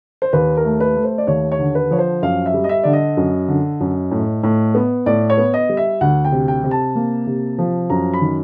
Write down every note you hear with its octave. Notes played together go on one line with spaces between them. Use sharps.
C5
D#2 B4
A#4
A3
B4
A3
C5
D5
D#2 C#5
C#5
D3
B4
F3 C#5
C5
F#2 F5
E5
G3
D#5
E5
D3 D5
D#5
F#2
D3
F#2
A2
A2
B3
A2 D5
C#5
B3
D#5
G3
E5
D2 F#5
G5
C3
G5
C3
A5
A#3
C3
F3
F#2 A#5
B5
D#3